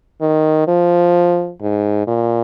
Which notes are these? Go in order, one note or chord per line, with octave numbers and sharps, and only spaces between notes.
D#3
F3
G#2
A#2